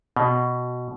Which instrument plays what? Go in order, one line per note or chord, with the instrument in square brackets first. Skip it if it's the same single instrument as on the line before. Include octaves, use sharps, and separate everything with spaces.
[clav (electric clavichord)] B2